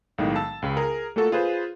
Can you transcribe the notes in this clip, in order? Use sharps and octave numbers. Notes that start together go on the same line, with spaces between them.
B1 A2 D#3 G#3
A5 E6
C#2 C#3
G#4 A#4
A3 A#3 F4 F#4 A4
F4 G#4 B4 C5